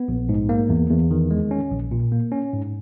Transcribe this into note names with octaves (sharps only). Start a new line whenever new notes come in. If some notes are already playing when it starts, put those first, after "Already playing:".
Already playing: B3
A#1
G#2
A#3
E2
E2
D#3
G#3
C#4
A#1
A#2
A#3
C#4
G#2